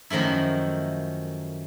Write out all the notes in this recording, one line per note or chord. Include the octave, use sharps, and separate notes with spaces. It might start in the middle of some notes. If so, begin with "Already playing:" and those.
F#2 D#3 F3 A3 E4